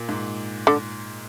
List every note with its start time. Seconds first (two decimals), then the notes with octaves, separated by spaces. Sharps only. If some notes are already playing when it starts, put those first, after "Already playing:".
Already playing: A#2
0.09 G#2
0.67 D3